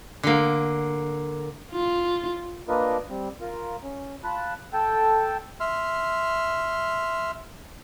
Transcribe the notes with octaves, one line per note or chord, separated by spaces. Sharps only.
D3 A#3
F4
A#3 D4 F4 A#4 B4 D#5
G3 C4
F4 A#4
C#4
F4 A5 B5 F#6
A4 G5 A5
E5 C6 F6